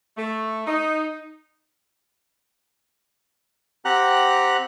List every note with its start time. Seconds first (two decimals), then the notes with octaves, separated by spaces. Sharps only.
0.17 A3
0.67 D#4
3.85 C4 G4 F#5 A#5 F#6